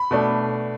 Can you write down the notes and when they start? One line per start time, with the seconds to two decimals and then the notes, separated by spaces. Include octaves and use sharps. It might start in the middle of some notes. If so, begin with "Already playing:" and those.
Already playing: B5
0.11 B2 A3 D4